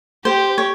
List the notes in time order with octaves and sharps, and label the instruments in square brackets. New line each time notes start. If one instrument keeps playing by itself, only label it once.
[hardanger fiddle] G4 [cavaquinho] C5
[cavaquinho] C#5